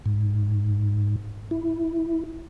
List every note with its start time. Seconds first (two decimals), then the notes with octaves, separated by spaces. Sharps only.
0.06 G#2
1.51 E4